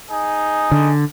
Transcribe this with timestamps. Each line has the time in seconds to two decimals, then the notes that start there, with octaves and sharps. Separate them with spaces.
0.10 D#4 G#4
0.72 D3